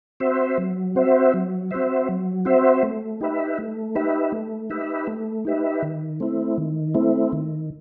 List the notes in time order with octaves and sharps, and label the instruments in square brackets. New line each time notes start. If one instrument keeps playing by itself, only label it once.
[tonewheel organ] C4 F#4 C5 E5
F#3
C4 F#4 C5 E5
F#3
C4 F#4 C5 E5
F#3
C4 F#4 C5 E5
A3
D#4 G4 B4 E5
A3
D#4 G4 B4 E5
A3
D#4 G4 B4 E5
A3
D#4 G4 B4 E5
D#3
A3 C4 E4
D#3
A3 C4 E4
D#3